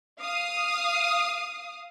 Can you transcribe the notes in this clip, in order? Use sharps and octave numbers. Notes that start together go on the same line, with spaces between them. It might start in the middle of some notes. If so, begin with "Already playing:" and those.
F5 D#6